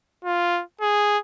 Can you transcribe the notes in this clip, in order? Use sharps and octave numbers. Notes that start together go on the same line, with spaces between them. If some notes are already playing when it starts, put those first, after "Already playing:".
F4
G#4